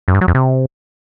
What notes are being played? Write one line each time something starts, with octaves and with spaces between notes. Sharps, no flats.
F#2
G2
F#3
F2
C3